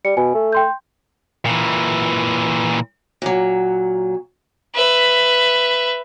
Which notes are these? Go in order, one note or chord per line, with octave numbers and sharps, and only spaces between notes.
G3 C#7
B2 G#5
A3
G5 C6 G6
A#2 E3
A#2 F#3
B4 E5